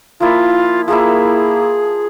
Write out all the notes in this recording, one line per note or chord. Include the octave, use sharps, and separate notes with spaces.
F3 A#3 E4 F4
F3 A#3 E4 G#4